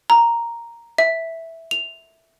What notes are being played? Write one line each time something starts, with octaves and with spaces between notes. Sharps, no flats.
A#5
E5
F7